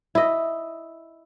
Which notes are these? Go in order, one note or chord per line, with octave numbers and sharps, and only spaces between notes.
E4 D#5